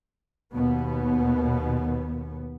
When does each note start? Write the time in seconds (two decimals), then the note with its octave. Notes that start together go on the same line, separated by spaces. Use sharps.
0.53 D#2 B2 B3